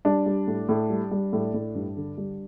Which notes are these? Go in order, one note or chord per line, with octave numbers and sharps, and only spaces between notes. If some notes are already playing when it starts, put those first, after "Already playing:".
G3 D4
G3
A2
A2
G3
G3
A2
A2
G2
D3
G3